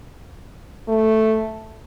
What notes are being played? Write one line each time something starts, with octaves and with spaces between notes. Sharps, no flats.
A3